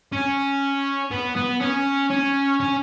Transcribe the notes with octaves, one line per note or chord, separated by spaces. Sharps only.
C#4
B3
B3
C#4
C#4
C#4